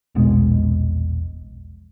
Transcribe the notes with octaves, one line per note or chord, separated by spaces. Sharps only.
E1 A#1 B2 G#3